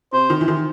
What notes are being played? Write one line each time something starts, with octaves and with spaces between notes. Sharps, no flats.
C3 C5
D#3
E3
D#3